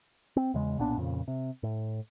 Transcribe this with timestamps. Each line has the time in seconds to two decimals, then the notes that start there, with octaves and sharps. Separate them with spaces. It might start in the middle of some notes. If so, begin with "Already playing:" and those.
0.36 C4
0.54 E2 C#3 G#3
0.79 B1 A#2 B3 D4
0.97 F2 A#2 C#3
1.28 C3
1.63 A2